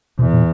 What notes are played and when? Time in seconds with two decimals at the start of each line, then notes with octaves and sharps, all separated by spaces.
0.19 E2 B2
0.33 A#2